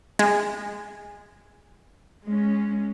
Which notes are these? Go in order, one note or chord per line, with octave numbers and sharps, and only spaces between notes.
G#3
G#3 C#4